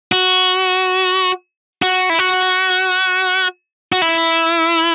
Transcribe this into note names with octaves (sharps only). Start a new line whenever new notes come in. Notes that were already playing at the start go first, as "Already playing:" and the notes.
F#4
F#4
E4
F#4
F#4
E4